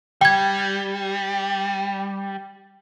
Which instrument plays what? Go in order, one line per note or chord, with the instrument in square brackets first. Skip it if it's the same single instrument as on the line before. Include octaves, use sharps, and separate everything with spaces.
[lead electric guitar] G3 [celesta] G5 G#6